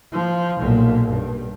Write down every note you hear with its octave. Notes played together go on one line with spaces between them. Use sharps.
F3
B1 A#2
G2